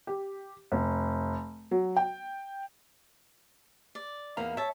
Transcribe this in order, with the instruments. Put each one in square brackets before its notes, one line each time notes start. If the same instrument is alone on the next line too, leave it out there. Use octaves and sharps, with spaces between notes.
[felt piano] G4
F1
F#3
G5
[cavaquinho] D5
[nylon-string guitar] E2 A#3 D#4 [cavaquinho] F5 A#5 B5
[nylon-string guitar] C#5 [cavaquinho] E5 A5